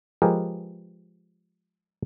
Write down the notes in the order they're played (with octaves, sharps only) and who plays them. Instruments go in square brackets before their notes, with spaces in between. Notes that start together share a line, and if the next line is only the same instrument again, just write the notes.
[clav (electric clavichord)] F3 G#3 G4 G#4 A#4 B4